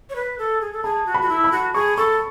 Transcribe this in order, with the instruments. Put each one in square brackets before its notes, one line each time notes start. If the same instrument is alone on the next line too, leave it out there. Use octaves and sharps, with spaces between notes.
[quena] C#5
B4
A4
G#4
A4
[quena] G#4 [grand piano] A5
[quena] F#4
[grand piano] B5
[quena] F#4
E4
[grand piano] B5
[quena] F#4
[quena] G#4 [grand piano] C#6
[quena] A4 [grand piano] C#6